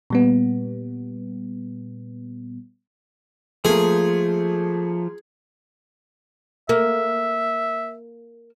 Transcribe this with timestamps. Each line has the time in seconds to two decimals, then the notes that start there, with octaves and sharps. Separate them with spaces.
0.10 A#2 G3 B3
3.65 F3 A3 A#3 G#4
6.69 A#3 E5